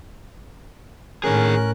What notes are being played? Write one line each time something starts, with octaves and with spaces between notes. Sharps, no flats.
A2 D#3 C#4 G#4 A#4 F#6